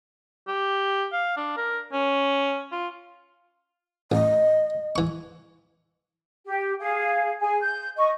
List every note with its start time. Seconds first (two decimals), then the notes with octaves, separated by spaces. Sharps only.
0.48 G4
1.12 F5
1.37 D4
1.57 A#4
1.93 C#4
2.72 F4
4.12 A1 D#5
4.96 E3 C#6
6.46 G4
6.80 G#4 F5
7.41 G#4 G#5
7.61 G6
7.97 D#5 C#6